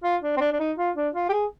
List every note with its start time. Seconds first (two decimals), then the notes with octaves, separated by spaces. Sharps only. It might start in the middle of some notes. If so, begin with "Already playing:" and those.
0.04 F4
0.23 D4
0.37 C4
0.41 D4
0.52 D4
0.60 D#4
0.78 F4
0.96 D4
1.15 F4
1.29 G4
1.33 G#4